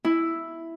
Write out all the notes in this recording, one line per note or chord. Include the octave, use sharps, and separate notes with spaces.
E4